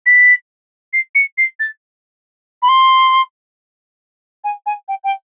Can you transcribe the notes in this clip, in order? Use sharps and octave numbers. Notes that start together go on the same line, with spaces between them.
B6
C7
C#7
C7
A6
B5
C6
G#5
G#5
G5
G5